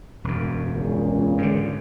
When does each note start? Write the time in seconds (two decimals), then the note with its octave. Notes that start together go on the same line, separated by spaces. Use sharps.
0.24 E1 F#2
0.72 C#2 A#2 C#3
1.38 G#2 D3